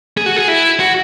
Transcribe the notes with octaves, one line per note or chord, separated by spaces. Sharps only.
G#4
F#4
G#4
E4
F#4